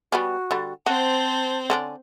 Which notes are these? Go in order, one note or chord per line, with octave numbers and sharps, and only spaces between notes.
G3 B3 C#4 F#4
D3 G3
C4 F#4 C5 A5
D3 C#4 D4